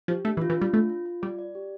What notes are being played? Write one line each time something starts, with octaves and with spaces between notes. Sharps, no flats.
F3 G4
A3 D4
E3
F4
E3
G3 D4
A3 F4
F4
F4
G3 D5
D5
G4